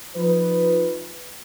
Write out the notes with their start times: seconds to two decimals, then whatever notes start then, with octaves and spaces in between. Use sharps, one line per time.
0.15 F3 D#4 B4